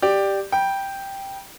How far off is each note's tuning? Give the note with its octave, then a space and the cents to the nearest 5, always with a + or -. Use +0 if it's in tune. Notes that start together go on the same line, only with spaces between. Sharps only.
G4 +0 D5 +10
G5 +0 B5 -30